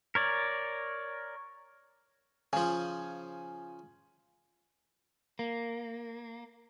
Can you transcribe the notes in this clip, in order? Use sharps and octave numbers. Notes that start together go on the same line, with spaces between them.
A#4 C#5 D5
C#3 F3 G#5
A#3